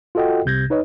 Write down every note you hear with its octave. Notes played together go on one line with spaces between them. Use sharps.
F4 F#4 A4 D#5 F#5 G5
C2 C3 G6 G#6 A#6
D#4 B4 C#5 D#5